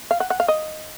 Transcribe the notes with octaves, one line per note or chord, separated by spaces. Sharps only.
F5
F#5
F#5
F5
D#5